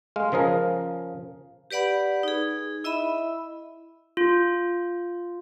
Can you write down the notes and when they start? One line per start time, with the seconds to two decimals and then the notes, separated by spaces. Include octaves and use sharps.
0.16 G#3 F5
0.32 C#3 F3 G#4 A#4
1.71 G4 B4 D5 F#5 B5
2.23 D#4 G#4
2.84 E4 D#5 E5 B5
4.17 F4